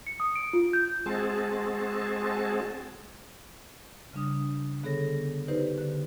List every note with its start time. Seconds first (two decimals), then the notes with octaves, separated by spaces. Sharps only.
0.07 C#7
0.20 D#6
0.36 D7
0.53 F4
0.73 G6
1.06 G#3 C4 F#4 G#4 A5
4.13 C#3 G3 D4 D#6
4.83 D3 B3 G#4 A4 C#5 A#6
5.48 D#4 G4 B4 C5 D5
5.78 D3